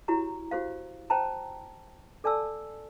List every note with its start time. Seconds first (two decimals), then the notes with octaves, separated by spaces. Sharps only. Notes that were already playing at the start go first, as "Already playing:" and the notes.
0.08 E4 F#4 G4 C#5 A#5
0.51 F#4 G4 C5 F5
1.10 C5 G5 A5 A#5
2.24 A4 D5 G#5 A5 E6